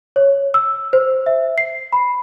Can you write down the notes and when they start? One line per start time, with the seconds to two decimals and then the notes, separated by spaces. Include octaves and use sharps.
0.16 C#5
0.54 E6
0.93 C5
1.26 E5
1.58 C7
1.93 B5